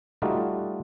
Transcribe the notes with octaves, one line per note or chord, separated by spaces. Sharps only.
G3 A3 D#4 F4 F#4 D5